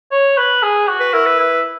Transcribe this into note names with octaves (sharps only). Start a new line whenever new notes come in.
C#5
B4
G#4
F#4
B4
E4 A#4
B4
E4